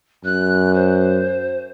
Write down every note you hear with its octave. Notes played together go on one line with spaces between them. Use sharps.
F#2 F#6
C5